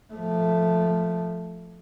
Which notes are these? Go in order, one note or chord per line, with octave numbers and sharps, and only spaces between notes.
F3 A3